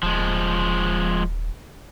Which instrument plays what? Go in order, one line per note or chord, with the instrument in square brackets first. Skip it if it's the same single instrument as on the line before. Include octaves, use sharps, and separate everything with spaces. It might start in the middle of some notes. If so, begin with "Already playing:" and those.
[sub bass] D#1 [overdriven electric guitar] F3 G#3